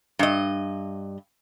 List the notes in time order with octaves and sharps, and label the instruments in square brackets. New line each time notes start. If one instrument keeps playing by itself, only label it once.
[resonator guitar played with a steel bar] G2 D#5